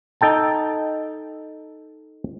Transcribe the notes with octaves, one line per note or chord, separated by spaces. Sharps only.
D#4 A4 G5 A5